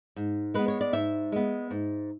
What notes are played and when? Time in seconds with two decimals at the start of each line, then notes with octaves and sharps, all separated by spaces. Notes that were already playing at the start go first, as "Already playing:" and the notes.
0.16 G#2
0.54 G#3 B3 B4
0.68 C#5
0.81 D5
0.93 G#2 E5
1.32 G#3 B3
1.71 G#2